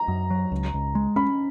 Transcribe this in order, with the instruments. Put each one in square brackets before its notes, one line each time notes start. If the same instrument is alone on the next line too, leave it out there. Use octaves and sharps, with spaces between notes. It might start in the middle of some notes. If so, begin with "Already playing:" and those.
Already playing: [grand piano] A#5
[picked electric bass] F#2
F#3
C#2
C#2
G#3
[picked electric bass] C#4 [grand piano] B5